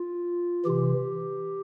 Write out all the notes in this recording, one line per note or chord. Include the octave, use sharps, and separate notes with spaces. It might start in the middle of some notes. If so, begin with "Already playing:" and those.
Already playing: F4
C3 E3 G4